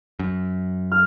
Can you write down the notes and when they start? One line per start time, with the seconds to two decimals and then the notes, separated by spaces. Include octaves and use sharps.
0.19 F#2
0.92 F6